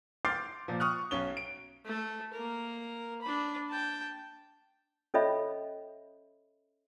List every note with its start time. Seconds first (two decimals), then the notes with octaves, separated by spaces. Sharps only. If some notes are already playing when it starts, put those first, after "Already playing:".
0.25 C6 D6 F6 G6 A6 C7
0.68 A#2 F3
0.80 C#6 D#6 F6 F#6
1.11 B1 C#4 G7
1.37 D7
1.85 A3 A4
2.33 A#3 A#4
3.22 D4 B5
3.69 G5 A5
5.14 C#4 A4 C#5 D#5 E5 B5